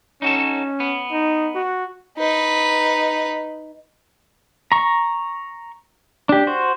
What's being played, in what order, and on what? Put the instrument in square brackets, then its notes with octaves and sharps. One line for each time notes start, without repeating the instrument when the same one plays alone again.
[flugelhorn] C#4 [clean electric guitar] D#4 F#4 A4
[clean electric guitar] B3
[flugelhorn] D#4
F#4
[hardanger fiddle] D#4 B4
[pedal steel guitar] A#5 C#6
D4 G4
F#4 C5